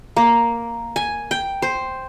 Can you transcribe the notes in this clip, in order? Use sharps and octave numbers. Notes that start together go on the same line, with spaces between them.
A#3
G#5
G5
C5